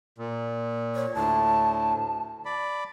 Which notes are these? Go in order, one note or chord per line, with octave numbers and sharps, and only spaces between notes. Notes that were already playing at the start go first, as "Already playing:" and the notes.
A#2
C#5
D2 A2 A5
D5 B5